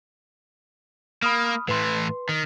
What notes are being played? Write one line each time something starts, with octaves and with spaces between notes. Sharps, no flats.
A#3 B5 D#6 F6
A2 E3 B4 C6
D#3